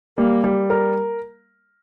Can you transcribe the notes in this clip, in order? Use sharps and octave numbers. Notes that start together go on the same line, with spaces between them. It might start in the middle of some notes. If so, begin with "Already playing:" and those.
G3 A#3
G3
A#4